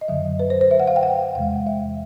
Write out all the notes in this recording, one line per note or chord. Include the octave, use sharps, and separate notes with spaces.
D#5
F#2 D3 F#3 E5
B4
C5
C5
E5
F#5
F5
G5
F#5
E2 C3 E3 G#3 F5
E5